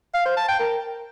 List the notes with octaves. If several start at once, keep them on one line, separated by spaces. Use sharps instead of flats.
F5
C5
A5
G5
A#4